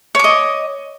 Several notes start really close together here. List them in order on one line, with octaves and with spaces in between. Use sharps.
C#5 D6 D#5